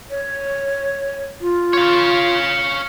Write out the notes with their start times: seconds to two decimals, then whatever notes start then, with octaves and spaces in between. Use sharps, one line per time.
0.10 C#5
1.41 F4
1.73 C#5 F5